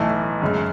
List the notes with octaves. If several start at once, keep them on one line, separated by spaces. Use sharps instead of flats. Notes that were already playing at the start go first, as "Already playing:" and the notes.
Already playing: B1 A2 E3 A3
F#2 C#3 G#3